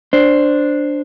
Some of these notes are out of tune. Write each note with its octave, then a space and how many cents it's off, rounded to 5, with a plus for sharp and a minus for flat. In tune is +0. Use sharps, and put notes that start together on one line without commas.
D4 +0 C5 +0